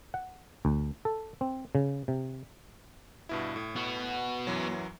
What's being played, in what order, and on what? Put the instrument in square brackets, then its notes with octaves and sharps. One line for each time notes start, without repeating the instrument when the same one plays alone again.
[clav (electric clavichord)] F#5
D2
A4
C4
C#3
C3
[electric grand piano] G2 B2 E4
A2
[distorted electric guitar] B3 F#4
[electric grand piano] F#2 E3 F#3